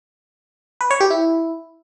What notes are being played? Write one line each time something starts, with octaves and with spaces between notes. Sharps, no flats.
B4
C#5
G4
E4